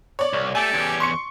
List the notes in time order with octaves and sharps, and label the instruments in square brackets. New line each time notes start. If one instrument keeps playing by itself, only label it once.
[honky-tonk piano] C#5 D5
[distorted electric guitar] C2
[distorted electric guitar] A3 [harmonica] G4 A4 D5 [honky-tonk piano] G#5
[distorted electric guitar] E2 C#4
[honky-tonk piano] C6 C#6 C#7